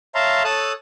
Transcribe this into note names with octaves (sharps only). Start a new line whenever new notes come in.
C#5 E5 F5 A5 A#5 C6
A4 C#5 A5 D#6 E6 F#6